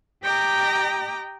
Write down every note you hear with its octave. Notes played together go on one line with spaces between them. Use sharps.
G4 D#5 G5 A#5 D6